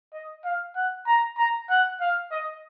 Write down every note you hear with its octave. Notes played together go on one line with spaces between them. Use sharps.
D#5
F5
F#5
A#5
A#5
F#5
F5
D#5